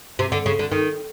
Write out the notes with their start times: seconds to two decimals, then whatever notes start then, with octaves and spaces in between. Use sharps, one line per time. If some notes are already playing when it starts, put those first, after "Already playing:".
0.19 C3
0.32 D3
0.46 C#3
0.59 D3
0.72 D#3